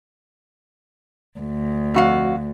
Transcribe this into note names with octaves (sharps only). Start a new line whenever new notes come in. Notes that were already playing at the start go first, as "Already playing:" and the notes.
D2
F2 F#4 F5